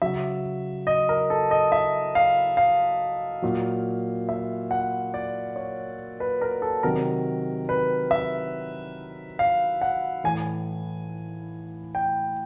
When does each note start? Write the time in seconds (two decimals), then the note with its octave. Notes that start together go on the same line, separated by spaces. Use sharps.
0.02 C#3 F#3 E5
0.87 D#5
1.09 A#4
1.30 A4
1.51 D#5
1.72 E5
2.15 F5
2.57 F5
3.42 A#2 F#3
4.29 E5
4.71 F#5
5.14 D5
5.56 C#5
6.20 B4
6.42 A#4
6.62 A4
6.83 C3 D#3 F#3 A#4
7.69 B4
8.11 E5
9.39 F5
9.81 F#5
10.24 A2 E3 G#5
11.95 G5